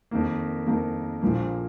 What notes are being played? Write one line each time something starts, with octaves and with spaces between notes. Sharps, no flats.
F2 D#3 A#3
F2 D#3 A#3
A#1 A#2 F3 A#3